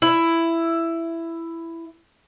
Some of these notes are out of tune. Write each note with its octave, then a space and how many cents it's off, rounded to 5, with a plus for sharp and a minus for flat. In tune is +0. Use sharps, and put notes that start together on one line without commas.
E4 +10